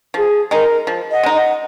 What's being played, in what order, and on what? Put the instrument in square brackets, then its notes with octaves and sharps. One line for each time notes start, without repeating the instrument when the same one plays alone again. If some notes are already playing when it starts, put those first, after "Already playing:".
[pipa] F3 [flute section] G#4
[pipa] G#3 D#4 [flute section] A#4
[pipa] F3
[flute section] D#5 F#5
[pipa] G#3 D#4
[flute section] D#5 F#5